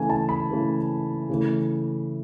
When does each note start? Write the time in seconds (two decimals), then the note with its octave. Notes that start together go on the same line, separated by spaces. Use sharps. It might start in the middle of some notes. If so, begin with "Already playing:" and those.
Already playing: C#3 E3 A3 G#5
0.10 A5
0.29 B5
0.50 C#3 E3 A3
1.30 C#3 E3 A3